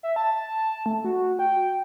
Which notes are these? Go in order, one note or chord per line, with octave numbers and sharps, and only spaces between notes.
E5
A5
A3
F#4
G5